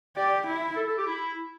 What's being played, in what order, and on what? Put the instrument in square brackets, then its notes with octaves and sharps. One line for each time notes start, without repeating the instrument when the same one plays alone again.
[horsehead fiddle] G4 [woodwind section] D5
[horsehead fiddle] E4
[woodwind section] A4
A4
G4
E4